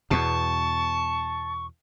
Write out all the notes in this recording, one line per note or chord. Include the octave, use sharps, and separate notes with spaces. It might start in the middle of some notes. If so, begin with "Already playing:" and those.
E2 B2 A5 C#6